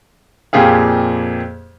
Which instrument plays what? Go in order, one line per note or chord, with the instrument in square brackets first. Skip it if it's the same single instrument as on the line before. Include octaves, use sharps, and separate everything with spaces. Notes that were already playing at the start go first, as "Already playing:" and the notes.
[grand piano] F2 A#2 G4 G#4 F5